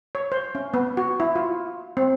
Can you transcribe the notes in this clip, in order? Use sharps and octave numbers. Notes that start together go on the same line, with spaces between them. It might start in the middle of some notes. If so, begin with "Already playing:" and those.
C#5
C5
C#4
B3
F#4
E4
F4
C4